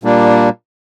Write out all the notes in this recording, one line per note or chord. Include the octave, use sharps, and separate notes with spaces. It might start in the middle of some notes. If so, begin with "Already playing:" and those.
A#2 G3 A#3 D4